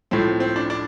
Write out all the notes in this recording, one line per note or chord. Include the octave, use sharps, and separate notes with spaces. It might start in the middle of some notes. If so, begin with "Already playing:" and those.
A2 F3 C4
C4
D4
D4